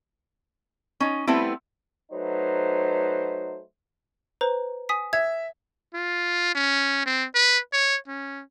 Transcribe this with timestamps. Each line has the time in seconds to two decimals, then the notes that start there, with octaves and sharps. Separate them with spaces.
1.00 C#4 D#4
1.27 G3 A3 B3 C4 E4
2.12 F#3 A3 D#4 B4 C5
4.41 B4 C5 A#5
4.89 G#5 D#6 B6
5.13 E5 G#6
5.94 F4
6.55 C#4
7.06 C4
7.35 B4
7.73 C#5
8.08 C#4